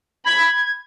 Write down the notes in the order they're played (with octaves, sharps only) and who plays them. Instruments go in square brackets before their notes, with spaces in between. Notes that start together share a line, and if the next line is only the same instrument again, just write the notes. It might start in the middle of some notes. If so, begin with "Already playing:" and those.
[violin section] B5 [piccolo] G#6